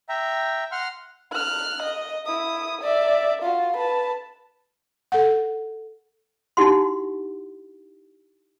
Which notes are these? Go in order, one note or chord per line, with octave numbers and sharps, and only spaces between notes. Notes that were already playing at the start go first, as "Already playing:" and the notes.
E5 G5 A#5
F#5 C6 F6
F6 F#6
D#5
E4 D#6
D5 E5
F4 F#4
B4 A5
A4 F#5
D#4 E4 F#4 G4 F#5 C6